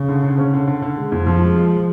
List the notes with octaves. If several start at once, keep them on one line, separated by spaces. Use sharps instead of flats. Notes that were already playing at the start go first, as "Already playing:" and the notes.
Already playing: C#3
D3
D3
C#4
D3
D3
D3
G#3
F2
F2 F3
G#3
G#3